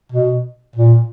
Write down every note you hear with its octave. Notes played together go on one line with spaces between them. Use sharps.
B2
A#2